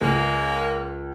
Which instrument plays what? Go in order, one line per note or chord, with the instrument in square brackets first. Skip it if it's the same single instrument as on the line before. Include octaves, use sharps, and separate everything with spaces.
[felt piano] C#2 [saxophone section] C#3 G#3 A#3